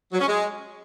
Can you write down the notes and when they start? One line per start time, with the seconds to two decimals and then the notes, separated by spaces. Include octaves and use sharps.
0.12 F#3
0.20 C#4
0.27 G#3